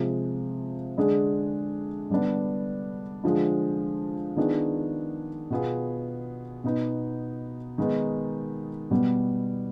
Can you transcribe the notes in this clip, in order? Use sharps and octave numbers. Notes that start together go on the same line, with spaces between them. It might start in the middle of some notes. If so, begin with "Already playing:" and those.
Already playing: C3 F3 G#3
D3 G#3 D4 G#4
D3 G3 B3 D4
D3 F3 G#3
D#3 B3 D4 F4 G#4
B2 B3 F4 G#4
B2 B3 D#4
D#3 G#3 B3 D#4
B2 G3 B3